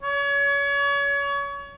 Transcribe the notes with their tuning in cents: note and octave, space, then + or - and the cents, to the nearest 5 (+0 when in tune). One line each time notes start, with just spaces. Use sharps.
C#5 +30